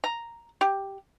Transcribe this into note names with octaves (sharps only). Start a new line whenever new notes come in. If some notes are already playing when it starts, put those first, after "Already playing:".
A#5
G4